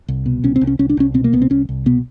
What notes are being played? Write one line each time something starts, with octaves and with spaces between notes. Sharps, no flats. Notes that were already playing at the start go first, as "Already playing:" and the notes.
C2
B2
C2 C#4
C4
C2
C#4
C2 C#4
D4
C2 C#4
B2 C4
A#3
C2 B3
C4
C2 C#4
C2
B2 B3